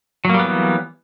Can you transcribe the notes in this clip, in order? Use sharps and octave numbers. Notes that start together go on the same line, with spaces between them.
E3 F#3 G3 A#3 B3